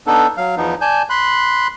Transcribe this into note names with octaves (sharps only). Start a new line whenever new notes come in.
B3 D4 D#4 A4
F#3 F5
E2 F3 B3 D#4
D5 G#5 A5 G6
B5 C6 F#6